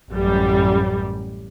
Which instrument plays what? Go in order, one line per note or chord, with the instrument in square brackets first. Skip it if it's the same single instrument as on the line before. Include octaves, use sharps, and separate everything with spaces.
[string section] A1 F#2 G3